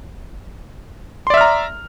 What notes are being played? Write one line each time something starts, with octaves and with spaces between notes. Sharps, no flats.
D5 E5 A#5 C6 F6